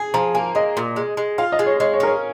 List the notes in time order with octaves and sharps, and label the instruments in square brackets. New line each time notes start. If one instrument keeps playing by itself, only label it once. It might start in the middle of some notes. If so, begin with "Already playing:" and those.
Already playing: [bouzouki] G#4 [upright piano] G#5
[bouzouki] F3 [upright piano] A#5
[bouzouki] A#3 [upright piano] G#5
[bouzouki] G#3 [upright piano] D#5
[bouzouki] A#2
G#3
G#3
[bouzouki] F4 [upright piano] F5
[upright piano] D#5
[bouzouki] G#3
[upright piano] C#5
[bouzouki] G#3 [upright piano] C#5
[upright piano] C#5
[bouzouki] C#4 [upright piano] A#4
[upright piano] C#5